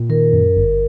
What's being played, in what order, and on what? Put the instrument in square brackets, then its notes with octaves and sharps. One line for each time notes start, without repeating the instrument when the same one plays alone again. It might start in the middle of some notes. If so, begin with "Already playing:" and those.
Already playing: [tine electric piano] A#2
[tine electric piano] D#3 [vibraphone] A#4
[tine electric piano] F#2
G1